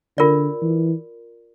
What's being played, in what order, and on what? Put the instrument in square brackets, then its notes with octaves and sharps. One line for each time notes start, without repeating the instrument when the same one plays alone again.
[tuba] D3 [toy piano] F4 A#4 D5
[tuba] E3